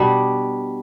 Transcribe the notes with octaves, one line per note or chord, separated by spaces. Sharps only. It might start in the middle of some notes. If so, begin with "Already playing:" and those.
Already playing: B2 G3 D4